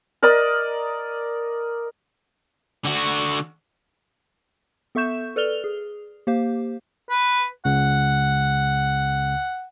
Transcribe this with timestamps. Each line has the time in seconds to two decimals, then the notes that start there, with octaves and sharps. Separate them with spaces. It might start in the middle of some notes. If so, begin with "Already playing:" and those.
0.22 A#4 D5 D#5
2.85 D3 F#4
4.95 B3 A4 E5 C#6 G6 E7
5.36 A4 B4 D5 F6 F7 G7
5.64 G#4
6.27 A#3 G4 C5 F5
7.10 B4
7.65 C#2 C#3 F#5